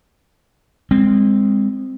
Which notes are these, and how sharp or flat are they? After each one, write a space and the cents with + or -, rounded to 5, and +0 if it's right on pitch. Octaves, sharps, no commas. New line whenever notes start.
G#3 -25 C4 +0